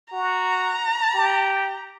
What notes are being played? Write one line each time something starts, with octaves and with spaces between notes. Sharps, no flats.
F#4 A#5
G4